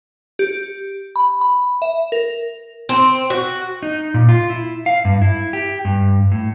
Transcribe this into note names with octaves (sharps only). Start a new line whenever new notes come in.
G4
B5
B5
E5
A#4
C4
F#4
D#4
A#2
F4
E4
F5
G2
E4
G4
G2
A2